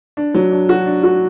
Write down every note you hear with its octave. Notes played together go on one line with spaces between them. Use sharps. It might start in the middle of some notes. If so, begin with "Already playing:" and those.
D4
F#3
D4
F#4
D4
F#4